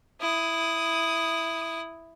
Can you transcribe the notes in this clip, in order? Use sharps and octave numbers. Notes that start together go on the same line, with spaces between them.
E4 D#6